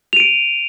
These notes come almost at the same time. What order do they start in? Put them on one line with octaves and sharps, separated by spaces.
F7 D#7 D7